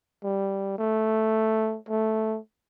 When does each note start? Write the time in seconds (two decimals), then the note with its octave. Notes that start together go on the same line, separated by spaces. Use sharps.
0.24 G3
0.78 A3
1.89 A3